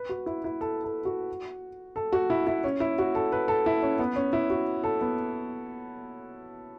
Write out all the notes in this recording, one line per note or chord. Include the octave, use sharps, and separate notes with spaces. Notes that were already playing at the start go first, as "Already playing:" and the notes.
Already playing: B4
F#4
E4
E4
A4
A4
F#4
A4
F#4
E4
E4
C#4
E4
F#4
A4
B4
A4
E4
C#4
B3
C#4
E4
F#4
A4
B3